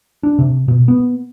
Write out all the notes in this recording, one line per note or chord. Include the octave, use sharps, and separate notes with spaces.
D4
C3
B2
B3